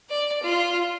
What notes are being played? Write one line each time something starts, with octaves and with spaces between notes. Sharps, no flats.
D5
F4